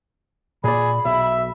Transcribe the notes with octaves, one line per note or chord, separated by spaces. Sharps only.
A#2 G#4 D5 B5
B1 E5